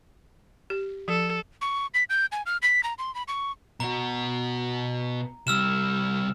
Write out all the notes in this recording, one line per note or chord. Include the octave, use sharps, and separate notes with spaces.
G4
F3 A4
C#6
B6
G6
G#5
F6
B6
A#5
C6
B5
C#6
B2 F#4 A#5
C2 G3 E6 F6 E7